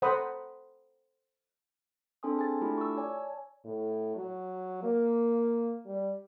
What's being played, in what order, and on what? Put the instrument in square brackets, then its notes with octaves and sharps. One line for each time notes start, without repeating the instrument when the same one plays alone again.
[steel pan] A4 C5 F#5 A#5 B5 D#6
[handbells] C4 D4 A4 G#5 C6 D#6
G#4 G#5 A6
A3 D4 E4 F4 G4 A4
C#6 E6
C#5 D5 G#5
A5
[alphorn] A2
F#3
A#3
G3